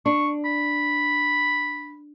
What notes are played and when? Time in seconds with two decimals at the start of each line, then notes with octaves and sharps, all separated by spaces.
0.06 D4 C#6
0.45 B5